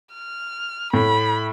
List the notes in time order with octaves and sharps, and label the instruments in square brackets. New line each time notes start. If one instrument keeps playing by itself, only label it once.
[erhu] F6
[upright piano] A2 [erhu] B5